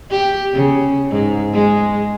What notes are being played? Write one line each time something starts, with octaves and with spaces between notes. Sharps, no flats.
G4
C#3
G#2
G#3